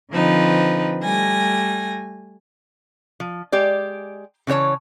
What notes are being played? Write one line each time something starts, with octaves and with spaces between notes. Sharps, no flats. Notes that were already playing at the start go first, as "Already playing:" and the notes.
D3 F3 C4 D#4 B4
G3 A3 G#5 A#6
F3
G#3 G4 D5
C#3 E3 C4 C#5 A5